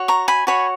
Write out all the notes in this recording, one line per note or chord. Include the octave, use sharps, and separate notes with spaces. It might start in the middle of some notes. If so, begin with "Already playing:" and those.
Already playing: F#4 C#5
A#5 C#6
G#5 B5
F#4 C#5 G#5 B5